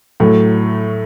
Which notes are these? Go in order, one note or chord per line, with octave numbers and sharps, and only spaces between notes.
A2 F#3 A3